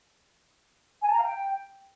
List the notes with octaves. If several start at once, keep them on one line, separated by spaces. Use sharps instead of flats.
G#5
A5
A#5
F5
G5